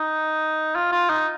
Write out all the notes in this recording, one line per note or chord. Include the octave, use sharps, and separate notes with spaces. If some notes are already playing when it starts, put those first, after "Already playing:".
Already playing: D#4
F4
F4
D#4